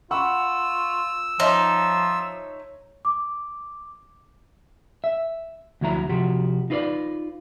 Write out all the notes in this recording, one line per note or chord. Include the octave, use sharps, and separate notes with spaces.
F4 F#5 B5 C#6 E6
F3 D#4 C#5 E5 C6
D6
E5
D2 F3 F#3 E4 A#5
C3 F3 F#4 G4
D#4 F4 B4 C#5 D5